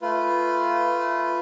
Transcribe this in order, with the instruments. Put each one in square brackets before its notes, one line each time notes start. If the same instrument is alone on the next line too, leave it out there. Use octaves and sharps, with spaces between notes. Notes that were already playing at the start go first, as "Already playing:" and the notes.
[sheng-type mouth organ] A3 F4 B4